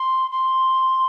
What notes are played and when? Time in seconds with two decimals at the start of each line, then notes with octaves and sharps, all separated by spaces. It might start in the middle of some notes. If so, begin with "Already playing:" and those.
Already playing: C6
0.31 C6